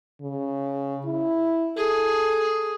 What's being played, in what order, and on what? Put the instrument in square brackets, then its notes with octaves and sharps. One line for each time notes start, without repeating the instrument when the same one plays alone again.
[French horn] C#3
E4
[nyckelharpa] G#4 [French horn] A4